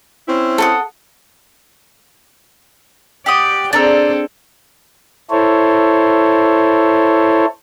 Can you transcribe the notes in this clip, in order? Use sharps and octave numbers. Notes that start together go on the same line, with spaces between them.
C4 C#4 E4
A4 F#5 D#6
G4 D5 F#5 D#6
C4 D4 G#4 A4 D5 A#5 E6
E4 A4 C5 C#5